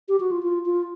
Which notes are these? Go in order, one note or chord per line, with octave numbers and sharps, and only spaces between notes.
G4
F#4
F4
F4
F4